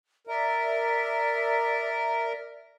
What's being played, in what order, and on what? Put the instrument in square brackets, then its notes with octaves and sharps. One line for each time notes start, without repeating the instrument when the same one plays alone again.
[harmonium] A#4 [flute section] D5 E5